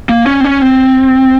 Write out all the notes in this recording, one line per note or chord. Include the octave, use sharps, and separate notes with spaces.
A#3
C#4
C4
C#4
C4